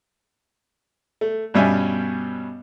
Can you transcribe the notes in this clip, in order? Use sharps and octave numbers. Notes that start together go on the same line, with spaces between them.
A3
G2 B2 G3 C#4 E5 G#5